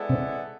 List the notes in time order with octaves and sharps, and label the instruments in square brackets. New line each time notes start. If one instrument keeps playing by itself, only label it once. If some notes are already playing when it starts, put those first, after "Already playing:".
Already playing: [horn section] G#3 B3 E4 A4 D5
[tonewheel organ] C3 C4